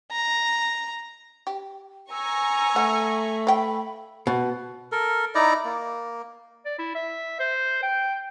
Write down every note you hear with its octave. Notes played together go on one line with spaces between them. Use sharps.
A#5
G4
G#5 A#5 C#6 E6
A3 F#5
F5 G5 B5
B2
A4 A#4
D#4 E4 D5 A#5
A#3
D5
E4
E5
C5
G5